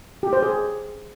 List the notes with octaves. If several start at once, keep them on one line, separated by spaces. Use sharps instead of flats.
G4
C5
G#4